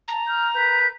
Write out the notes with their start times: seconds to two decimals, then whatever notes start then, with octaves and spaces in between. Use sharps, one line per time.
0.08 A5 A#5
0.26 F6 G6
0.54 A#4 B4 G6